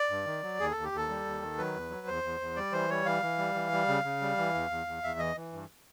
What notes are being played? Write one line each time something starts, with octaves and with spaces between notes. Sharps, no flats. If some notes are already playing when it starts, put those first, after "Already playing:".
Already playing: D5
G2
D#3
F#3
D#2 G#4
D#2 A4
G4
D#2 A4
G3
D#2
D#3
F#3 B4
E2
F#3
E2 C5
E2
E2
G3 D5
E3 C5
G3 C#5
E3 F5
E3
G3
E3
G3
C#3
C#3
G3
E3
E2
E2
E2
E2 E5
E3 D#5
E3
G2